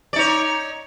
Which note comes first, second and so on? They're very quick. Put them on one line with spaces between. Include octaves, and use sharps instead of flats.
D5 D#4 C#5